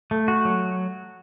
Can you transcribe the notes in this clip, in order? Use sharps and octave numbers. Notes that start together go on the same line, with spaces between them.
A3
F#4
F#3